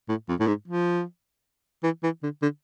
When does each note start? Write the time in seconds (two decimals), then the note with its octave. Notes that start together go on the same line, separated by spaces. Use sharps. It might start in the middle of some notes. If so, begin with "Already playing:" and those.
0.09 A2
0.29 F2
0.40 A2
0.47 G#2
0.68 F3
1.83 E3
2.03 E3
2.23 D3
2.42 D3